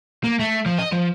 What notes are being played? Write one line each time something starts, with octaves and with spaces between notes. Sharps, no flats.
A#3
A3
F3
D#5
F3